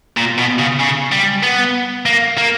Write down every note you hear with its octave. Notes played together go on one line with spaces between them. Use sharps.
A#2
B2
C#3
C#3
G3
B3
A#3
A#3